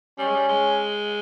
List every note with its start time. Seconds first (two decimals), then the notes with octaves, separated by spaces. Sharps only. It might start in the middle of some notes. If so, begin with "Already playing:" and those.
0.18 G3 C#4
0.27 G#3
0.35 G3
0.49 G#3